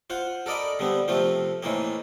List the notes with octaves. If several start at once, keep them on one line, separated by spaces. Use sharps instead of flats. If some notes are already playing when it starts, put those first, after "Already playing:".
F4 C5 F#5
A4 A#4 D5 D#5 B5
D3 G3 B3 C4
C3 F3 A3 C4 F4
A2 D#3 E3 A#3 C4